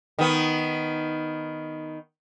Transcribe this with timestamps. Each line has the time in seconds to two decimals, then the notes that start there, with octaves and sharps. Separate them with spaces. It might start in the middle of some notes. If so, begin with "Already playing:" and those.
0.19 D#3 B3